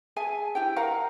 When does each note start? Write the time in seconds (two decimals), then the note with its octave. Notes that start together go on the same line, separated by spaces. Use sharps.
0.16 G#4 E5 G#5 A5
0.55 E4 G4 G5
0.76 A#4 F5 F#5 A#5